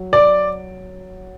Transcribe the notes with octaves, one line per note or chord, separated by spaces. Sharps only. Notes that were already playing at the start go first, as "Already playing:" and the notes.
Already playing: F#3
D5